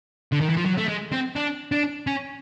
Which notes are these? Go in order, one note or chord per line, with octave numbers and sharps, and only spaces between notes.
D3
D#3
E3
F3
F#3
A3
G#3
C4
D4
D4
C#4